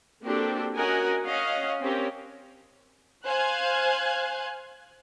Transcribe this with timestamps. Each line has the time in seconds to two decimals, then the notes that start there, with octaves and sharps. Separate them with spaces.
0.24 A#3 C4 D4 F#4 G4 A4
0.75 C#4 F#4 A#4 D#5 F#5 G#5
1.25 C#4 C#5 D#5 F5 F#5
1.80 C4 C#4 G4 A#4
3.25 C5 F5 G#5 F#6 G#6